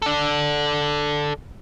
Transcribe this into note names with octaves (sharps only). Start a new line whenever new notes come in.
A4 D5